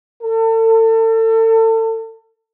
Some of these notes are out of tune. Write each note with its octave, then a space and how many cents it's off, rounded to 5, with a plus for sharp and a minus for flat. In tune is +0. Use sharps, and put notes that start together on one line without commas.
A4 +35